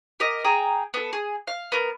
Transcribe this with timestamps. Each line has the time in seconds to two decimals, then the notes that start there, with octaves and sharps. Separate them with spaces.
0.20 G4 A#4 D#5
0.44 G#4 G5 A#5
0.94 B3 A4
1.13 G#4
1.47 F5
1.72 B3 A#4